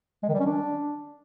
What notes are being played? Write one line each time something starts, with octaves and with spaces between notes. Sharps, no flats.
G#3
D#3
G3
C#4
D4